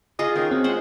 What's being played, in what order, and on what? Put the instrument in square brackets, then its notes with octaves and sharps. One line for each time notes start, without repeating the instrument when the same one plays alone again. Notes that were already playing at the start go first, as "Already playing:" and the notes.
[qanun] F4 G#4 [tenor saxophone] D#5
[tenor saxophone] D#3 [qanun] C#4
[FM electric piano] C4 [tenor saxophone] F#4
[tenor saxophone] G#3 [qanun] C5 F#5